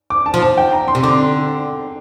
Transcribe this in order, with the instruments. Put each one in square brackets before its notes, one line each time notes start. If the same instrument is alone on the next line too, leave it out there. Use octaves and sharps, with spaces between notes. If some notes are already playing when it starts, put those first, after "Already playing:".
[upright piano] D6
A5
[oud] F3
[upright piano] A5
G5
A#5
C6
[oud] C3
[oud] D3 [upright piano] D6